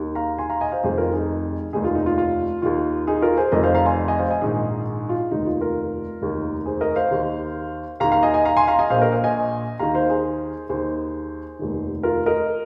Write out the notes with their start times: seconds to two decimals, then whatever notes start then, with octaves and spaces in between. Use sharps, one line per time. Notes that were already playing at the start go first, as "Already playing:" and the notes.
Already playing: D#2 D#3
0.15 F5 A#5
0.38 G#5 C6
0.49 F5 A#5
0.61 D#5 G#5
0.72 C5 F5
0.83 F1 F2 C3 D#3 G#4 C5
0.98 F4 A#4
1.13 D#4 G#4
1.73 F1 D#2 D#3 D#4 G#4
1.84 F4
1.95 D#4
2.06 F4
2.18 F4
2.62 D#2 D#3 F4
3.07 D#4 G#4
3.22 F4 A#4
3.37 G#4 C5
3.52 F1 F2 D#3 A#4 D#5
3.63 C5 F5
3.74 F5 A#5
3.86 G#5 C6
4.08 D#5 G#5
4.19 C5 F5
4.31 D#5 G#5
4.42 A#1 G#2 D#3 D#4 G#4
5.09 F4
5.31 F1 D#2 D#3 D#4
5.46 F4
5.61 F4 A#4
6.21 F1 D#2 D#3
6.66 G#4 C5
6.81 A#4 D#5
6.96 C5 F5
7.11 D#2 D#3
8.00 D#2 F5 A#5
8.04 D#3
8.12 F5 A#5
8.23 D#5 G#5
8.34 D#5 G#5
8.45 F5 A#5
8.57 G#5 C6
8.68 F5 A#5
8.79 D#5 G#5
8.90 A#1 A#2 C5 F5
9.01 A#4 D#5
9.12 C5 F5
9.24 D#5 G#5
9.79 D#2 D#3 F5 A#5
9.95 C5 F5
10.09 G#4 C5
10.69 D#2 D#3 G#4 C5
11.59 F1 D#2 D#3
12.03 F4 A#4
12.26 A#4 D#5